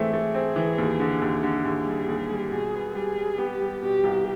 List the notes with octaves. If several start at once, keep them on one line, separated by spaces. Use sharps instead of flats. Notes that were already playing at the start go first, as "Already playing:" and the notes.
Already playing: E3 A3 C4 G#4
A3
C4
E3
D#2
D3
D#2
D3
D#2 G#4
G3
D#2
G3
B2 G#4
B3
G3 G#4
G3
B3 G4
G3
B2 G4
C2